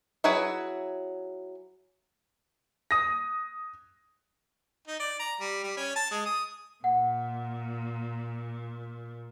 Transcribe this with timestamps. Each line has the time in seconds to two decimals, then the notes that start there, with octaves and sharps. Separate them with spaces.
0.24 F#3 E4 G#4 B4 E5
2.91 D#6 A#6
4.88 D#4
5.00 D5
5.19 A#5
5.40 G3
5.63 G3
5.77 C#4
5.96 A5
6.11 G#3
6.26 D#6
6.84 A#2 F#5